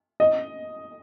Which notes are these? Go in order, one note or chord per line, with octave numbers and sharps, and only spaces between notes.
D#5